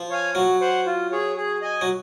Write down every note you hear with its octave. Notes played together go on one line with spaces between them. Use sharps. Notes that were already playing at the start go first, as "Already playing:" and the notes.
Already playing: F3
C#5 F5 G#5
F#3 F#4
C5 F#5
F4
G#4 C#5
G#4
D#5 G#5
F#3